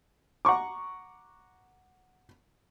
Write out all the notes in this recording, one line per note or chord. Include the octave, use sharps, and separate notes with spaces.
F#5 A#5 C#6 D6